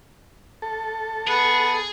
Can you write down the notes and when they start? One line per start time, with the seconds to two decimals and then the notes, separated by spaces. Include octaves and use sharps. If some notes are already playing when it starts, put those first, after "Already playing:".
0.62 A4
1.28 B3 G#4